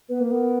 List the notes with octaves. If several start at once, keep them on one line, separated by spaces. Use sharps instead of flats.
B3 B4
A#3
B3 A#4